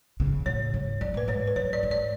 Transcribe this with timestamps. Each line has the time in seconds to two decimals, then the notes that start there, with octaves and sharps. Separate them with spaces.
0.20 C#3
0.46 A2 C#5
0.74 G#2
1.01 F#2 D5
1.14 A2 B4
1.28 G#2 C#5
1.48 B4
1.56 F#2 C#5
1.73 D5
1.83 G#2
1.91 D5